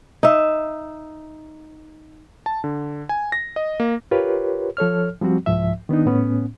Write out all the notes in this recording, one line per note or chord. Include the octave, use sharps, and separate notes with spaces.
D#4 E5
A5
D3
G#5
A#6
D#5
A#3
F4 G4 A#4 B4 C#5
F3 A4 C#5 F6
F3 G3 C4 F#4
C2 G#2 F3 E5
D#3 B3 D4 D#4
A2 B3 C#4